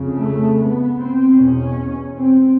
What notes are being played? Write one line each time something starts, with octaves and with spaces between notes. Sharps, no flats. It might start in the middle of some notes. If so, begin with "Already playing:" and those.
Already playing: F2 C#3
A3
B3
C4
E2 B2 C#4
C4